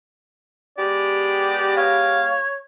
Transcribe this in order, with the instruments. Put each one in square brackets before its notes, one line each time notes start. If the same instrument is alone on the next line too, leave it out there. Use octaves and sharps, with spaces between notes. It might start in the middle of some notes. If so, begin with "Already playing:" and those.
[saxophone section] G#3 B3 G4 [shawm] D5
[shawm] C#5 [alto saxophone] F5